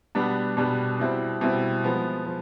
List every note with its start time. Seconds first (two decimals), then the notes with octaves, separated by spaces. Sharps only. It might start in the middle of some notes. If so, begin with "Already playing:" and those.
0.15 B2 G3 B3 D4
0.57 B2 G3 B3 D4
0.99 B2 G3 C4 E4
1.41 B2 G3 C4 E4
1.84 F3 G#3 B3
2.25 F3